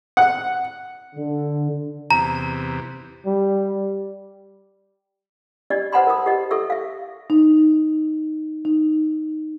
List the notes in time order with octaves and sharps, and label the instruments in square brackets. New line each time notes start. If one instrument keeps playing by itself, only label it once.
[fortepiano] F#5
[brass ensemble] D3
[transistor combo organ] E2 C3 [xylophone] A#5
[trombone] G3
[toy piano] D4 G4 D5 D#5
B4 C5 F#5 A5 B5 C6
A#4 D#6
G4 D#5
A4 E5 C#6 E6
E5 F5
[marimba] D#4
D#4